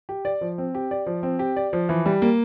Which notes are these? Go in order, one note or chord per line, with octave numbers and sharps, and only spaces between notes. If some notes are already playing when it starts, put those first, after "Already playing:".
G4
D5
F3
C4
G4
D5
F3
C4
G4
D5
F3
E3
G3
A#3